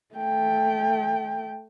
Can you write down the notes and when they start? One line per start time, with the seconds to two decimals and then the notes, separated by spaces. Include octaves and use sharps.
0.15 A3 G5